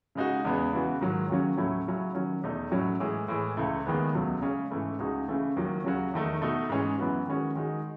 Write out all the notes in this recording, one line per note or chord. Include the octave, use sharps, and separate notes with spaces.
C#3 G#3 D#4 F#4
E2 C#3 G#3 B3
C#3 E3 B3 F#4
G#2 D#3 F#3
D#2 C#3 F#3 C#4
A2 F#3 A3 C#4 E4
C#3 F#3 C#4 E4
D#3 F#3 C#4
E2 B2 A3 D#4
A2 F#3 C#4
A2 E3 G#3
A2 E3 G#3
C#2 C#3 E3 A3
D#2 D#3 G#3 B3
C#2 B2 F#3 A3
C#3 G#3 C#4
G#2 E3 A3 C#4
C#2 C#3 G#3 D#4 F#4
C#3 E3 A3 C#4
D#2 D#3 F#3
C#3 F#3 C#4 F#4
E2 D#3 A3 D#4
B2 A3 D#4 F#4
G#2 E3 G#3 C#4
F#2 E3 B3 F#4
D#3 G#3 C#4 F#4
D#3 G#3 D#4 F#4